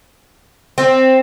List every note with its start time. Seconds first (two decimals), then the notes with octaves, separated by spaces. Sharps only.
0.78 C4